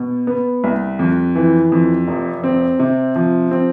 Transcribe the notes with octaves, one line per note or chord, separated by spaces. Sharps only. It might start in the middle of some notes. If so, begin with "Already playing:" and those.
Already playing: B2
B3
C2
F2
E3
F2
F1
C4
C3
F3
C4